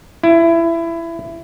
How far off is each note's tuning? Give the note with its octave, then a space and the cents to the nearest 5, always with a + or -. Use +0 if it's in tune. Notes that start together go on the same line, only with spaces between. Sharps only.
E4 +20